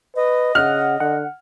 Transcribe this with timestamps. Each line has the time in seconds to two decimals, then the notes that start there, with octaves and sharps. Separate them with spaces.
0.16 B4 D#5
0.55 C#3 F#5 F6
1.00 D3 F#5